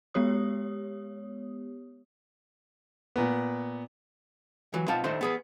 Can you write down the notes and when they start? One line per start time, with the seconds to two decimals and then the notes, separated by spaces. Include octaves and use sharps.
0.14 G#3 B3 G4 C#5 D#6
3.16 A#2 B3
4.74 E3 F#3
4.88 B1 C4 F4 F#5 A5
5.04 A2 D#3 A3 D4 C5 C6
5.21 B3 G#4 B4